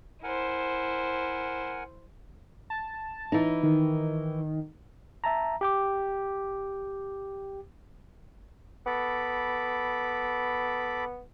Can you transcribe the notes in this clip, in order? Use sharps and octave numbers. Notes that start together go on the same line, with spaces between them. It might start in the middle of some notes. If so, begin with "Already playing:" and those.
E4 A#4 C5 F#5 G#5
A5
E3 D#4
D#3
E5 A5 A#5
G4 G5 D6
B3 A4 B5 D6